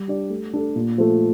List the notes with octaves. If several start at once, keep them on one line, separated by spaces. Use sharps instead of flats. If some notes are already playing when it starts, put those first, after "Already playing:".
Already playing: G3
D4 G4 D5
A3
D4 A4
A#2
F3 A3